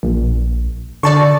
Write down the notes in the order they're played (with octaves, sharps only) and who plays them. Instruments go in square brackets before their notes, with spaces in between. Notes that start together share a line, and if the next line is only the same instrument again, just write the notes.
[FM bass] A#1
[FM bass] D3 [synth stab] D5 A5 C#6